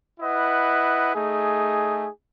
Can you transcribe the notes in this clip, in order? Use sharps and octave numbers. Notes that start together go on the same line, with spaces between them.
E4 B4 D#5 F#5
A3 D#4 G#4